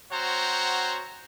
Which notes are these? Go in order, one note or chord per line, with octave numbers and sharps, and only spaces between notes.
C4 F#4 C5 C#5 F#5 A#5